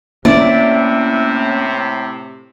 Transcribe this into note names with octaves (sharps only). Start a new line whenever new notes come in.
A2 C3 A#3 C#4 E4 D5